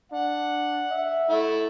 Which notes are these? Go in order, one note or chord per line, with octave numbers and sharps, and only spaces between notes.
D4 F#5
E5
A3 E4